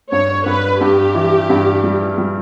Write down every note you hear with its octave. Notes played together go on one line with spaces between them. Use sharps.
G2 C#5
G2 B4
G2 G4
E3
G2
G3
G3